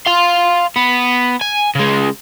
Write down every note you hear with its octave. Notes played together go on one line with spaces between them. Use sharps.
F5 C6
B3
G#5
C#3 G#3